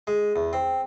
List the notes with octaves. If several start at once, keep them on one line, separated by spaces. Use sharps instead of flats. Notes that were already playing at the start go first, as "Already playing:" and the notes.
G#3
E2
C4